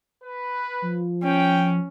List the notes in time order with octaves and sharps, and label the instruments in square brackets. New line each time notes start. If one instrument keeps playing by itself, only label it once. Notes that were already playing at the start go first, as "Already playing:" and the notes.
[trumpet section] B4
[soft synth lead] F3
[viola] C#4 [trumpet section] G5